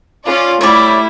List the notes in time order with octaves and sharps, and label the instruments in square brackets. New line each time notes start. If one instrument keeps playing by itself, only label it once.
[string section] C#4 F4 D5
[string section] G3 A3 E4 [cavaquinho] C#5 D5